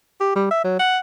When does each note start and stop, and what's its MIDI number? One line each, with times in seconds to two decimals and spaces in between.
0.21 0.35 67
0.36 0.49 55
0.51 0.61 76
0.64 0.75 54
0.79 0.99 78